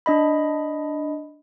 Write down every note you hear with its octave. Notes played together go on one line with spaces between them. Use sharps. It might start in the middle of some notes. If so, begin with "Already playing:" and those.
D4 D#5 B5